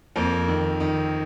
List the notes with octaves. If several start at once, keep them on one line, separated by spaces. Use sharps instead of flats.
F2 A#3
D#3
D#3